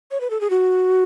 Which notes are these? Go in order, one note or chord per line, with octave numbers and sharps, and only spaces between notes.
C#5
B4
A4
G#4
F#4